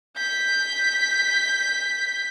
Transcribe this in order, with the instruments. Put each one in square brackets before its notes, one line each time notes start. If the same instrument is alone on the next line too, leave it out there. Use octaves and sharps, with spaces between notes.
[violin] G6 B6